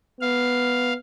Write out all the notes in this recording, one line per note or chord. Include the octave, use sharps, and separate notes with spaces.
B3 F5